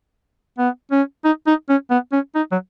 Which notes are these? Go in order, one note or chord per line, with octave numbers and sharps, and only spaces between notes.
B3
C#4
D#4
D#4
C#4
B3
C#4
D#4
F#3